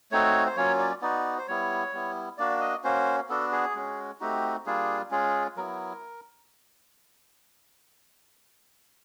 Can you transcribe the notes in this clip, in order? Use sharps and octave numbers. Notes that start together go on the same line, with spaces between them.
A3 C4 D#4 F#4 C#5
C5
F#3 A#3 C#4 F4 C#5
D5
B3 D#4 F#4 D5
C5
G3 B3 E4 C#5
G3 B3 E4
A#3 D4 F#4 D5
D#5
A#3 C#4 F#4 C5
B3 D4 F#4 A4
G#4
G#3 C#4 F#4
A3 C4 D#4 F#4 G4
G3 A#3 D4 F4 G#4
G#3 C#4 F4 G#4
F#3 B3 E4 A#4